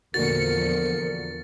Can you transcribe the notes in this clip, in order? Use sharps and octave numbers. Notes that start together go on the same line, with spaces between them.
E2 A#2 D3 F3 F#4 A#4 A6 C#7